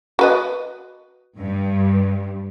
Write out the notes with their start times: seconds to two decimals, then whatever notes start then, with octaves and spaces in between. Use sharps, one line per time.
0.19 F#4 B4 D#5
1.38 G2